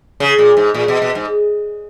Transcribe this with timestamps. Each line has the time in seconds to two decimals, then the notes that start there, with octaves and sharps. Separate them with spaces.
0.20 C#3
0.38 A#2
0.57 G#2
0.74 A#2
0.88 B2
1.02 B2
1.15 G#2